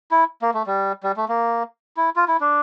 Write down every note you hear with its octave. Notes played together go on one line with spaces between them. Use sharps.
E4
A#3
A3
G3
G3
A3
A#3
E4
F4
E4
D4